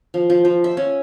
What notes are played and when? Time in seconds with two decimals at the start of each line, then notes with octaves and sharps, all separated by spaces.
0.14 F3
0.30 F3
0.45 F3
0.64 E5
0.77 C#4